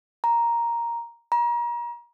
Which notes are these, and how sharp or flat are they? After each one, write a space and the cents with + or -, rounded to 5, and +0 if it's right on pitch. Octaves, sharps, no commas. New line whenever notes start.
A#5 +5
A#5 +35